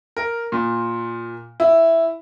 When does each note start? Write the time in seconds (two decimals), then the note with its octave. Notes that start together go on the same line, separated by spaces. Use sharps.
0.17 A#4
0.52 A#2
1.60 E4